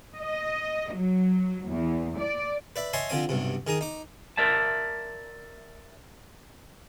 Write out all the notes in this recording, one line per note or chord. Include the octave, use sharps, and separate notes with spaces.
D#5
F#3
E2
D5
B4 D5 E5
C#5 D#5 E5 G#5 A5 C6
D3 F3 C4 G#5
B1 G2 C3
D#3 G#4 A#5 D#6
D#4 D6
A#4 D5 E5 A5